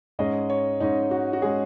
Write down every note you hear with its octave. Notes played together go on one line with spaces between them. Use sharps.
G#2 G#3 C#4 D#5
C#5
G#2 G#3 C#4 D#4
F#4
F#4
G#3 C#4 G#4